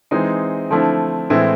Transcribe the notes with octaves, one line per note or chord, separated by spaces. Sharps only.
E3 G#3 C4 D#4
D3 F3 A3 C4 E4
A2 E3 G#3 C4 E4